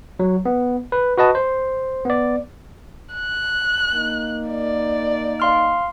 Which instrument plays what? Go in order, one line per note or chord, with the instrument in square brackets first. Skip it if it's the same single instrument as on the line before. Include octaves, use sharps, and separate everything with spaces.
[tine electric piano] F#3
B3
B4
F#4 B4 D#5 A5
C5
B3 D5
[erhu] F#6
[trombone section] A#3 D#4
[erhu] D5
[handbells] F5 C6 F6